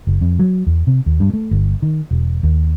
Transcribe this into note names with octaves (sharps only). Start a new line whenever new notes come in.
F#1
F2
F#3
E2
C3
D#2
G2
A3
G1
D#3
E1
D#2